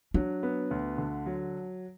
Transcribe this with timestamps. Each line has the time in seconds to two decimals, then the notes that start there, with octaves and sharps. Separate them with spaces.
0.14 F#3 D4
0.43 B3
0.71 D2
0.98 D3
1.26 F#3